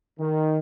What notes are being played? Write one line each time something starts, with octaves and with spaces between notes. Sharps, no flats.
D#3